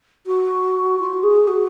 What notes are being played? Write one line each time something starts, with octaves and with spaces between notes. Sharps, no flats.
F#4
F4
F#4
G#4
F#4